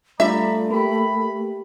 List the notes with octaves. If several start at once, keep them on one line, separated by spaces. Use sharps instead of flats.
G3 A3 D4 F4 D5 E5 A#5 B5
A#3 G4 B5